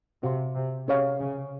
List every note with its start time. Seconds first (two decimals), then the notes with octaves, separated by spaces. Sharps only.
0.23 C3 F#4 C5 F5 C6
0.55 C3
0.88 C3 C#4 G#4 C#5 F5
1.20 C#3